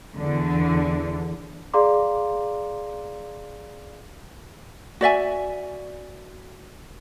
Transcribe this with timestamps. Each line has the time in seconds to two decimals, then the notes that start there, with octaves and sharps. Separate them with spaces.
0.17 E2 D3
1.74 G#4 D5 F5 A#5 C6 D6
5.01 F#4 D5 E5 G#5